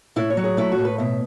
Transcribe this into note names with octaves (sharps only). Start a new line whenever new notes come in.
A2 E4
C#5
F#3
G#4
A3 E4
F#4
A2
B4
B2 E5